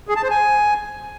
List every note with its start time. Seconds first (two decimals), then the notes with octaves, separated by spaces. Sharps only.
0.08 G#4
0.16 A5
0.23 C5
0.31 G#5